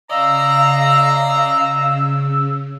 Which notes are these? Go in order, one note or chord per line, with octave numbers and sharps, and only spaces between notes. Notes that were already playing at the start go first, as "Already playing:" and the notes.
C#3 D5 D#5 F5 A#5 E6